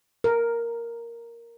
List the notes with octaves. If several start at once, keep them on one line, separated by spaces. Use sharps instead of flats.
A#4